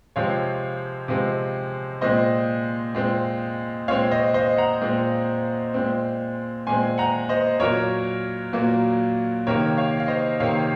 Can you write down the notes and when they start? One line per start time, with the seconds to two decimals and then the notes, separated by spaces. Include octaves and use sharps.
0.16 C3 F3 G#3 C4 C#5 F5
1.08 C3 F3 G#3 C4
2.01 A#2 G#3 C4 C5 D#5
2.95 A#2 G#3 C4
3.88 A#2 G#3 C4 C#5 F5
4.11 C5 D#5
4.34 C5 D#5
4.58 F#5 A#5
4.81 A#2 G#3 C4
5.74 A#2 G#3 C4
6.67 A#2 G#3 C4 G#5 C6
6.98 F#5 A#5
7.29 C5 D#5
7.60 A#2 F#3 A#3 A#4 C#5
8.53 A#2 F#3 A#3
9.47 C3 D#3 A#3 A#4 C#5
9.78 C#5 F5
10.00 F5
10.08 C5 D#5
10.40 C3 D#3 A#3 C#5 F5